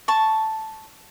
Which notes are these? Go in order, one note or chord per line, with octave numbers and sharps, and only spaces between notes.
A5 C#6